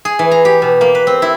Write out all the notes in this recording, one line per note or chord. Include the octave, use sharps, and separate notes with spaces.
G#4
E3
A#5
G4
B2
A#3
B4
C4
E4